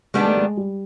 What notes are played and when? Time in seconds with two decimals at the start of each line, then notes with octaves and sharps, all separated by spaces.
0.14 D#3 G3 G#3 B3 D4
0.25 A3
0.37 G#3
0.57 G3